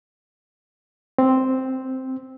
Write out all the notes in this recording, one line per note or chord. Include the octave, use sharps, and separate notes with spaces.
C4